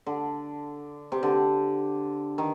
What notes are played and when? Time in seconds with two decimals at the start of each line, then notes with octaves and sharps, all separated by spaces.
0.06 D3
1.12 C3
1.23 D3
2.38 D#3